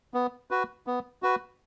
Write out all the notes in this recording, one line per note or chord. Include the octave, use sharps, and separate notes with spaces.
B3
F#4 B4
B3
F#4 B4